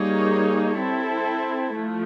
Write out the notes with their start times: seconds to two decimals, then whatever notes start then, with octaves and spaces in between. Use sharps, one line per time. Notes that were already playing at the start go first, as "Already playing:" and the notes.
Already playing: G3 A#3 D#4 G#4 C#5
0.76 C4 E4 A4
1.75 F3 A3